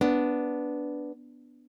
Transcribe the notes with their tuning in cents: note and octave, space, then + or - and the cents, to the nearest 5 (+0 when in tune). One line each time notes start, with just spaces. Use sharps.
B3 +0 D4 -5